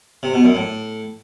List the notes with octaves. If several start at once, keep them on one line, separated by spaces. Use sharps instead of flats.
C3
B2
F#2
A2